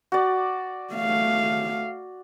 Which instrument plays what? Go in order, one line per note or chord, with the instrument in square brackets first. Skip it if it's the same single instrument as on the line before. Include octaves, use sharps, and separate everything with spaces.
[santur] F#4 D5
[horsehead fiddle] A3 F5